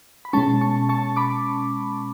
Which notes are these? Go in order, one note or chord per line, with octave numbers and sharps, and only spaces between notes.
B5
B2 G#3 C#4 A5 C#6
A5 C#6
A5 C#6
B5 D6